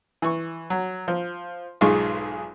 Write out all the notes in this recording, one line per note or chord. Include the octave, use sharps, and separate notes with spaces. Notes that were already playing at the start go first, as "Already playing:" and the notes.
E3 C#6
F#3
F3
B1 G#2 G#3 F4 G#4 C#6